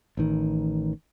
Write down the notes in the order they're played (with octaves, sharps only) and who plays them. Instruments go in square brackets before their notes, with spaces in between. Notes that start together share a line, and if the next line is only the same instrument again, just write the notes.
[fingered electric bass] A1 D#3